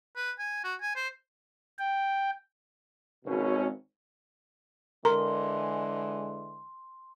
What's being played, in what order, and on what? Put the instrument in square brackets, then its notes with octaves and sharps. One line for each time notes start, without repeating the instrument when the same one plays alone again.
[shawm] B4
G#5
F#4
G#5
C5
[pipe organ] G5
[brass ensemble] G#1 B2 C#4
[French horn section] D3 E3 G#3 [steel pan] A#4 [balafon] A#5 [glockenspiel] C6